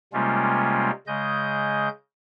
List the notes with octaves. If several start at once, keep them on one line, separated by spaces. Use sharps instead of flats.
C3 G3 G#3 A#3 C#4 F4
C#3 G#3 D#5 G6